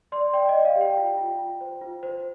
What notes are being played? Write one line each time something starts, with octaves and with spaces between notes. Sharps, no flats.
D5 C6
D5 G5
D#5
D5
F5
G4
G5
F4
F4
F4
C5
F4
C5